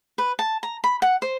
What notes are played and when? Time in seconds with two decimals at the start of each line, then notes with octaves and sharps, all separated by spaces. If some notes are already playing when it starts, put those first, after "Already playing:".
0.18 B4
0.39 A5
0.63 A#5
0.84 B5
1.02 F#5
1.22 C5